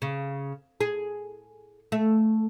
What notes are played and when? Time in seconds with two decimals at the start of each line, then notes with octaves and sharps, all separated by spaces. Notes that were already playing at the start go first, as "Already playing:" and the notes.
0.02 C#3
0.81 G#4
1.92 A3